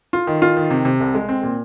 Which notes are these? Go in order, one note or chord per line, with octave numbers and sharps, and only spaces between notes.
F4
D#3
F4
D#3
C3
C3
C2
G#3
C4
A#2